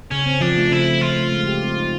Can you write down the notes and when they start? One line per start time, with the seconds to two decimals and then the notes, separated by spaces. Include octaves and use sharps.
0.11 C#3 C#4
0.26 C4
0.41 F3 D4
0.57 A3
0.71 C#3 E4
0.86 C4
1.01 F3 F4
1.17 A3
1.32 G#3
1.47 G4
1.63 C4
1.78 D#4